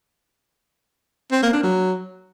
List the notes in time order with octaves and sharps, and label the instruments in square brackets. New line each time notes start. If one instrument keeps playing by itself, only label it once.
[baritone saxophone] C4
A#3
D4
F#3